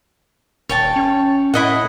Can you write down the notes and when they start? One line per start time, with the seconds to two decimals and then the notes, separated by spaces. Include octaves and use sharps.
0.69 D#1 C#5 G5 A5
0.96 C#4
1.54 A2 E4 D#5 F#5